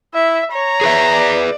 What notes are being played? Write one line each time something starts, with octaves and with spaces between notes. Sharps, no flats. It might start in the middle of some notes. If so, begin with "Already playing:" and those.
E4 E5
C#5 A#5
G#4 B4 E5
D5